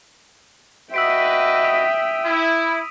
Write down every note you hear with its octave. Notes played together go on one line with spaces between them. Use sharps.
F#4 B4 D#5 E5 G5 E6 B6 D7
D#6 D#7
E4